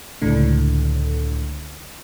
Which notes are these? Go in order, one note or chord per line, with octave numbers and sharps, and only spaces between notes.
C#2 A2 D3